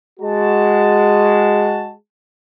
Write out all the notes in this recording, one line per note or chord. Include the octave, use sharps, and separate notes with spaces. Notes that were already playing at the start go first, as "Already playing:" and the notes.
G#3 F#4 A5